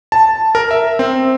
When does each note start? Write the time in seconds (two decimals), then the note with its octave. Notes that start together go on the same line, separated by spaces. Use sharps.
0.12 A5
0.55 A#4
0.71 E5
0.99 C4